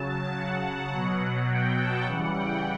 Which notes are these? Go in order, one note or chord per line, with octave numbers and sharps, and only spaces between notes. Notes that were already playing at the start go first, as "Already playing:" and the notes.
Already playing: C#3 F#3 A5
F#5
B2 F#3
G5
A5
C#3 E3 G3 F#5
G5